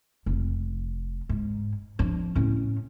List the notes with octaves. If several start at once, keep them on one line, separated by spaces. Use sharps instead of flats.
F1
G#2
F3 D4
A2 C#4